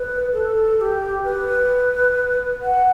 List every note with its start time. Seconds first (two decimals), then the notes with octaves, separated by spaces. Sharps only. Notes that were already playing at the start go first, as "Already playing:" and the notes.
Already playing: B4
0.33 A4
0.77 A4
0.81 G4
1.25 B4
2.62 F#5